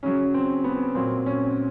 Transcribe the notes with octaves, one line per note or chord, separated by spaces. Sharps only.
C#3 F#3 C#4
C4
B3
A#2 F#3 C4
C#4